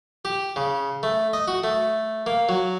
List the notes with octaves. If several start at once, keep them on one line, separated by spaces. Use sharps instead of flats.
G4
C#3
A3
D#5
F#4
A3
A#3
F#3